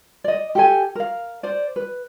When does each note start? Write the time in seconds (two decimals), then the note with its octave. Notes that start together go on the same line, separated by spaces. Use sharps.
0.24 D5 D#5
0.55 G4 A4 G#5
0.95 A#4 F5
1.43 C5 D5
1.76 B4